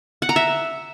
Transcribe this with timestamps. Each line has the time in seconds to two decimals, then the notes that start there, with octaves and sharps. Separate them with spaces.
0.22 F#5
0.29 A#5
0.36 E5